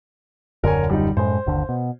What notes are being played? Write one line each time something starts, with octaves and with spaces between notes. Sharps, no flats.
D#1 F#2 D3 A#4 C#5 G#5
G3 D#4
F#2 A2 G#3 C5
G1 D#2 D3
B2